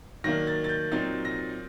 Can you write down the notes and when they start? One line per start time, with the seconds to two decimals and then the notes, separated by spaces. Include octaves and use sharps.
0.24 D#3 F#3 A#3 D4 A#6
0.47 A6
0.64 A6
0.69 G6
0.92 A#2 F#3 C4 D#4 A6
1.25 A#6